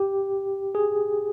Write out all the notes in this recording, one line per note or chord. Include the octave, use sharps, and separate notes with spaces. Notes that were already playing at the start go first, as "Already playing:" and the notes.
Already playing: G4
G#4